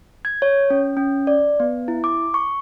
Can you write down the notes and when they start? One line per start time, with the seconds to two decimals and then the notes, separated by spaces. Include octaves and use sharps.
0.25 G#6
0.42 C#5
0.70 C#4
0.97 C#4
1.27 D5
1.60 B3
1.88 E4
2.04 D6
2.34 C#6